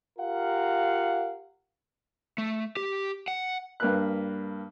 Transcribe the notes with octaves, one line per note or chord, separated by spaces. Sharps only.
F4 G4 A#4 F5 F#5
A3
G4
F#5
G2 A#3 B4 F#6